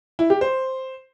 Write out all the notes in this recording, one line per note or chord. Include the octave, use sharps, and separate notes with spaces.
E4
G4
C5